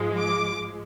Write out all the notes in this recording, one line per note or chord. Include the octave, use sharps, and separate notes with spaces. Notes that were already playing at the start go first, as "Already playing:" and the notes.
Already playing: G#2 F3 G#3
D6